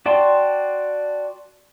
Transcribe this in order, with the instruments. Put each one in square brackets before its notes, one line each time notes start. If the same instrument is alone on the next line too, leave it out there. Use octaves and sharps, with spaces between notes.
[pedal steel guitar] F#4 D5 G5 A5 C6